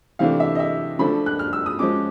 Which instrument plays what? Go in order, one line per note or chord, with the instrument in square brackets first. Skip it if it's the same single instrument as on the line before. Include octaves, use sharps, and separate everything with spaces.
[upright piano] C3 E3 A3 D4 F5
E5
D#5
E5
D3 F3 A3 D4 B5
F#6
F6
E6
D#6
F3 G#3 C#4 D6